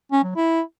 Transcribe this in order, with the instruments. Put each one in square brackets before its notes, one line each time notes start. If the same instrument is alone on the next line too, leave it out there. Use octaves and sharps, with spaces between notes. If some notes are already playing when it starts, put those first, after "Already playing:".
[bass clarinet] C#4
F#3
E4